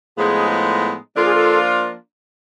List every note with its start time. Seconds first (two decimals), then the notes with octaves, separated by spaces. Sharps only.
0.17 A2 F3 G#3 B3 D#4 G#4
1.16 F3 A#3 D4 F4 A4
1.25 G#4
1.34 A4